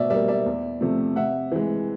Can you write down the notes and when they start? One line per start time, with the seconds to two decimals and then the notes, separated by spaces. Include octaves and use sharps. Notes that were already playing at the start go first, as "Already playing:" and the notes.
Already playing: B2 D5 E5
0.10 G3 A#3 D5 E5
0.28 D5 E5
0.46 E2
0.81 C3 F3 A3
1.16 C3 E5 F#5
1.52 E3 G#3